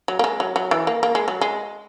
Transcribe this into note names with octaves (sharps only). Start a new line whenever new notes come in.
F#3
A#3
G#3
F#3
F#3
E3
A#3
A#3
G#3
F#3
G#3